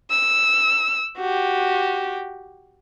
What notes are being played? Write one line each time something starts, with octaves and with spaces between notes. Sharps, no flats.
E6
F#4 G4